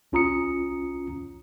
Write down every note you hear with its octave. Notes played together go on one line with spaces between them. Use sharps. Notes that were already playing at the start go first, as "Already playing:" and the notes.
C2 C#4 F4 A#5 D#6 C#7